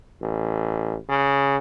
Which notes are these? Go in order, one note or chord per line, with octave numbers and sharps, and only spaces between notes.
A1
C#3